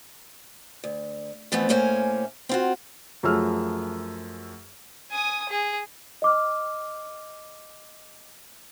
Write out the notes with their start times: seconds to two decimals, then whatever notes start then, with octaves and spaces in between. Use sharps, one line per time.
0.84 D2
1.52 F2 E3 A3 B3 C4
1.69 A2 A3 A#3 C#4 C5 G#5
2.49 C4 F4 F#4
3.23 F#2 F3 A3 G#4 E6 F6
5.11 G#5 D#6
5.49 G#4
6.22 D#5 D6 F6